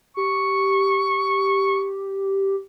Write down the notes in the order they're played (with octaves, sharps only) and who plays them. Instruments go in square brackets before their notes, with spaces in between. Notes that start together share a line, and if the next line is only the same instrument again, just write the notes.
[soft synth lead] G4 [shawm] C#6